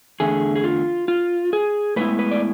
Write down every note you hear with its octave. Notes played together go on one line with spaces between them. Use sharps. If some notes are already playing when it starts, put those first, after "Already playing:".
E2 D3 A3 G#4
G#4
F4
F4
G#4
A2 G#3 B3 E4 B4
B4
D5